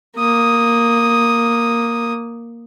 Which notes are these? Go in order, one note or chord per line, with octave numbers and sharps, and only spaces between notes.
A#3 D#6